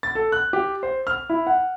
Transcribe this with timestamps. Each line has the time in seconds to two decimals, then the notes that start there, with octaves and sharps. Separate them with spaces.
0.03 A6
0.15 A4
0.32 F#6
0.53 G4
0.83 C5
1.07 F6
1.29 E4
1.47 F#5